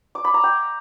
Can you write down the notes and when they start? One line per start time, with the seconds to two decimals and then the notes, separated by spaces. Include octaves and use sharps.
0.15 D6
0.24 B5
0.34 A#5
0.43 G5